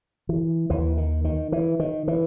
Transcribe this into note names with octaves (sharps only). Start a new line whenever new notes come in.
E3
D#2 E3
D#3
D#3
E3
D#3
E3